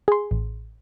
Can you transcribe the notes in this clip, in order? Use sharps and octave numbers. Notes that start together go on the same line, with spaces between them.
G#4 C6
A1